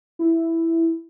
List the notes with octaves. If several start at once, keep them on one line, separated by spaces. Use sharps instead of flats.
E4